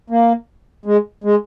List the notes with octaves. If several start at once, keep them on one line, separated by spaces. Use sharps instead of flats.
A#3
G#3
G#3